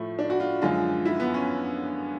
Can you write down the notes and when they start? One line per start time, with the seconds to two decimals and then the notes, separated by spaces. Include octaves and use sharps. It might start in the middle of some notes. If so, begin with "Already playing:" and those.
Already playing: A2 F3 A3
0.19 D4
0.30 F#4
0.40 F4
0.62 F#2 D3 F3 G#3 F4
1.06 E4
1.20 B3
1.34 C#4